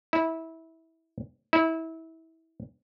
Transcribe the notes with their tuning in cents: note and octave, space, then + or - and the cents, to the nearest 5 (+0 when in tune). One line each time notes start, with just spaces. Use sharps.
E4 -20
E4 -25